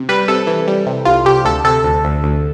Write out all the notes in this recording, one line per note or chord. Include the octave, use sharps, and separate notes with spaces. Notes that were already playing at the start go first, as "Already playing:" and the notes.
Already playing: C3
G3 B4
C3 A4
E3
G3
C3
C2 F4
C3 G4
D2 A4
C3 A4
D2
D2
D2